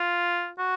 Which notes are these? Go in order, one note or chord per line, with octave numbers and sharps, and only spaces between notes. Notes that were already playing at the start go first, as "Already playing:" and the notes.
Already playing: F4
F#4